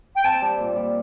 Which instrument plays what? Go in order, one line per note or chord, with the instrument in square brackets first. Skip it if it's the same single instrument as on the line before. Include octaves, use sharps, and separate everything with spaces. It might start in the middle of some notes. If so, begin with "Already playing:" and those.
[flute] G5
[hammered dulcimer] C4 [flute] A5
[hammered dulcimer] G3
A#2
G3